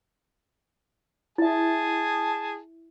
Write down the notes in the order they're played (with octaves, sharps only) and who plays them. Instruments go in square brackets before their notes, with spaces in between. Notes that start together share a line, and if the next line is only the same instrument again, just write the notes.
[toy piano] E4 E5 [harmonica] G#4 A5